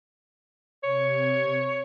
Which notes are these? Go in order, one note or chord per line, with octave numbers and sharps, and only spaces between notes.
C3 C#5 G#6 C#7